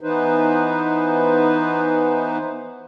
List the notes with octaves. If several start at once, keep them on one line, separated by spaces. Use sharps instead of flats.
E3 B3 D#4 B4 C5